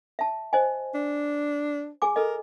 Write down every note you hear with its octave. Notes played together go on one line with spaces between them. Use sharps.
E5 A5
C5 D#5 G#5
D4
G#4 G#5 D6
A4 A#4 D#5